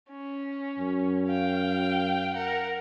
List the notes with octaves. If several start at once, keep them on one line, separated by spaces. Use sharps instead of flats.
C#4
F#2
F5 G5
A#4 F#5